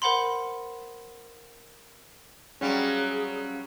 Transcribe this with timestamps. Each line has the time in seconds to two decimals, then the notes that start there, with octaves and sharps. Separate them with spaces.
0.02 A#4 C5 F#5 B5 C6
2.61 F#3 G3 C4 C#4 G#4 F5 D7